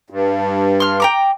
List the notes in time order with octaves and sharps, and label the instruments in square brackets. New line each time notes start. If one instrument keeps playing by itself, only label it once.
[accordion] G2
[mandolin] C6 F6
G5 A#5 D6